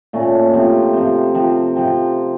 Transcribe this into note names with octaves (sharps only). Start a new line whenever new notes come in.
A#2 A3 C#4
C3 F3 C4
C3 F3 C4
C3 F3 C4
C3 F3 C4